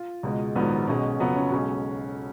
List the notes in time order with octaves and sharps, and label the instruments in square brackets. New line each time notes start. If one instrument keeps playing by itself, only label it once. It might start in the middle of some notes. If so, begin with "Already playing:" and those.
Already playing: [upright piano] F4
C#2 B2 G#3
A#1 G#2 D#3 F#3 B3
B1 B2 G#3 C#4
F2 C#3 F#3 B3
C#4
B1 B2 G#3 C#4